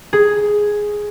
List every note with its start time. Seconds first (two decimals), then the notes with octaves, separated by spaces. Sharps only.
0.13 G#4